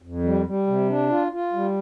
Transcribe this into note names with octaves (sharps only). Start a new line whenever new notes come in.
F2
G3
G3
C3
D4
F4
F4
G3